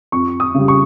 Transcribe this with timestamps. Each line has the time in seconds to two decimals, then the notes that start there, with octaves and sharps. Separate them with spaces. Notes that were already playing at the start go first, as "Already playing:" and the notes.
0.12 F2 C#6
0.40 D#6
0.55 C#3 G3
0.68 C#6